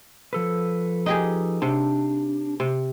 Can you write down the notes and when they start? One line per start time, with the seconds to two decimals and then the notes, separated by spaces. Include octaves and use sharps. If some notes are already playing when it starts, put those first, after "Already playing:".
0.33 F3 A4 B4
1.06 D#4 G4 G#4
1.62 C3 D4
2.60 C3